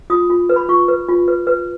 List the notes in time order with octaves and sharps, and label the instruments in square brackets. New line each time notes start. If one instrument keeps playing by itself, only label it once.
[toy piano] F4 D#6
F4
B4
B5
F4 C#6
B4
F4
B4
B4